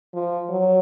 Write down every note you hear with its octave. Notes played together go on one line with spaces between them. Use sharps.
F3
F#3